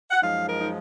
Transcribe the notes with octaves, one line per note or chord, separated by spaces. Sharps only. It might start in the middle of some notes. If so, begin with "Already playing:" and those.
F#5
F#2 F3 G#3 D#4 F5
A#4
D#4